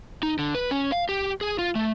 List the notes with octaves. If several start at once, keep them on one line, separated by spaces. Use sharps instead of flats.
D#4
D3
B4
C#4
F5
G4
G#4
F4
A3